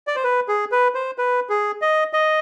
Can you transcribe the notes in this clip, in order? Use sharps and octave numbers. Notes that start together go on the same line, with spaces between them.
D5
C5
B4
G#4
B4
C5
B4
G#4
D#5
D#5